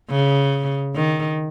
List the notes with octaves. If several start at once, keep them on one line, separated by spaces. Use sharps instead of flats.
C#3
D#3